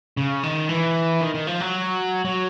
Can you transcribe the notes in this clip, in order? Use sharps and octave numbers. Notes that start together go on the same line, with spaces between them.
C#3
D#3
E3
D#3
D#3
F3
F#3
F#3